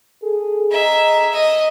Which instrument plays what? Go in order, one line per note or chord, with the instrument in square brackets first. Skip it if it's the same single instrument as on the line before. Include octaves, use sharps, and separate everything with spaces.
[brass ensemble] G#4 A4
[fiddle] G#4 E5 [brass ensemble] D#5 A#5
[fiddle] D#5